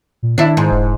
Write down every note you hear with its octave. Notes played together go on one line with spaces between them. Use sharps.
A#2
D#3 D4 E4
G#2
E1